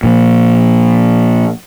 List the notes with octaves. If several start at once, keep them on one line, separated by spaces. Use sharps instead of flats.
A#2 F3